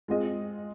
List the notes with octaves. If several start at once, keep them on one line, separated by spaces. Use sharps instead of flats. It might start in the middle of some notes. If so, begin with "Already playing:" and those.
G#3 C4 F4 G#4 D#5